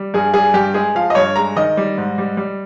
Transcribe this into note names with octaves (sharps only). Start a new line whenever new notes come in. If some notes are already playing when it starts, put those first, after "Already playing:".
Already playing: G3
G2 G#4
G3 G#4
G2 G4
G#3 G#4
F3 F5
D#5
G2 C#5
G#3 A#5
D#3 D#5
G3
G#2
G3
G3